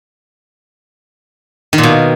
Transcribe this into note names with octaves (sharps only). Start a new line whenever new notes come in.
D#3
A#2
B2